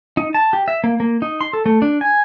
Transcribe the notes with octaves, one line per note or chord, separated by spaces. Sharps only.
D#4
A5
G4
E5
A#3
A#3
D#4
C6
A4
A3
D4
G#5